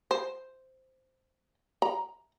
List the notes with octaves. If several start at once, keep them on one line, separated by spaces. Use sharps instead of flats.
C5
A#5